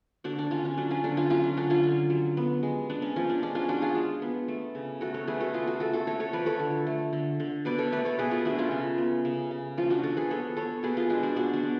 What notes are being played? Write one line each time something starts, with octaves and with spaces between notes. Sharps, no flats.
D3 D4 F#4
D4
D3 C#4 F4
C#4
F#3 D4
C#4 F4
D3 D4
C#4 F4
F#3 C#4 F4
D4
D3 D4
C#4 F4
D3
F#3
B3
G#3
G#3 D4
C#4
F3 C#4
D4
G#3 D4
C#4 F4
F3 D4 F#4
F4 G#4
G#3
B3
A3
C#3
A3 F#4 A4
A4 C#5
A3 G#4 B4
F#4 A4
A3 F4 G#4
F#4 A4
A3 F#4 A4
F#4 A4
A3 A4 C#5
A4 C#5
F3 B4 D5
A4 C#5
D3
A3
D3
D3
B2 B4 D5
A4 C#5
A3 B4 D5
A4 C#5
B2 G#4 B4
F4 G#4
A3 D4 F#4
C#4 F4
C#3
B3
C#3
C#3
F3 C#4 F4
D4 F#4
F3 F#4 A4
G#4 B4
B3 A4 C#5
B3 A4 C#5
B2 G#4 B4
F4 G#4
G#3 D4 F#4
D4 F#4
B2 D4 F#4
D4 F#4
B3